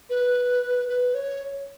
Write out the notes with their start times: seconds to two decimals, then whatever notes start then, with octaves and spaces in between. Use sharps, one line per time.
0.10 B4
0.89 B4
1.14 C#5